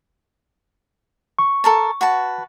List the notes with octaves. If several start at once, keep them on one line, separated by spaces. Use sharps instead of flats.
C#6
A4 A#4 A5
F#4 B4 A5